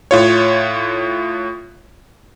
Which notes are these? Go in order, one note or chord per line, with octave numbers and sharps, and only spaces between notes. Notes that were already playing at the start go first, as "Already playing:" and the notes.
A2 F4 C#5